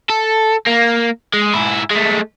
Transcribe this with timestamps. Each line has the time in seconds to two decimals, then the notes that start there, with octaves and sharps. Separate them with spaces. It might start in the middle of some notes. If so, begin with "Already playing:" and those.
0.09 A4
0.67 A#3
1.34 G#3
1.54 G#2 E4
1.90 G#3 A3